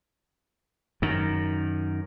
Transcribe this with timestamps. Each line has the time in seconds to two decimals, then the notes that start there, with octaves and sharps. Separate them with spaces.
1.02 F#2 D#3